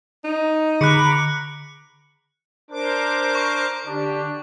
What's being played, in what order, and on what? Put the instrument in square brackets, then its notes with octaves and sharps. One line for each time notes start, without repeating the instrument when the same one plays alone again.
[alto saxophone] D#4
[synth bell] D3 G#4 C#6 [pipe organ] A#5 B5 D6 [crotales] F#6 C#7
[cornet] D4 [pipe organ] A#4 C5 D6
[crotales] C#6
[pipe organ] D3 G4 [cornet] D4